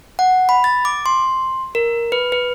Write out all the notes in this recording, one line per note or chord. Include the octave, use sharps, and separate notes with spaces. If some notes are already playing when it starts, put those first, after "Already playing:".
F#5
B5
A6
D6
C6
A#4
B4
B4